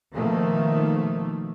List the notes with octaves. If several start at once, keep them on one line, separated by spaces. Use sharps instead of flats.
B2 D#3 F3 A3 A#3